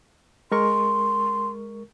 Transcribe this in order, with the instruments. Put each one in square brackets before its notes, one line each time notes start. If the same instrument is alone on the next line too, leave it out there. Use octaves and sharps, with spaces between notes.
[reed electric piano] G#3 A#4 C#6 [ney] C6